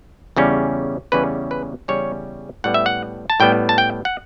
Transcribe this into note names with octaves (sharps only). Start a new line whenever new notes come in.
E2 C#3 G3 C#4
E2 C#3 G3 C#4 B4
B4
E2 C#3 G3 C#4 C#5
A2 G3 B3 F#5
E5
F#5
A5
A2 G3 B3 G5
A5
G5
F#5